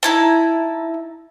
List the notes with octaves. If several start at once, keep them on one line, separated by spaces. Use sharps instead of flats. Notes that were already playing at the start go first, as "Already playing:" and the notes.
D#4 E4 A5